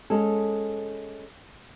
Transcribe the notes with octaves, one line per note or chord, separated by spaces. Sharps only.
G#3 C#4 A4